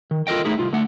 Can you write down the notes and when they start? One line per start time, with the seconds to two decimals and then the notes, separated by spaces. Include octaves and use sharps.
0.11 D#3
0.27 F4 A4 A#4 D#5 G5
0.45 A3 D#4 E4 G#4
0.59 C2 F4
0.73 D3 A3 F#5